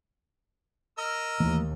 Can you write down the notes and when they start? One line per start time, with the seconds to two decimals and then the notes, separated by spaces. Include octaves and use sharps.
0.98 A#4 D#5 E6
1.40 D#2 E3 A3 A#3